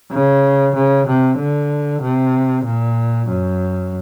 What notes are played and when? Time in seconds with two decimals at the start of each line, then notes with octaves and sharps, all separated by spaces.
0.12 C#3
0.75 C#3
1.06 C3
1.38 D3
2.02 C3
2.64 A#2
3.28 F#2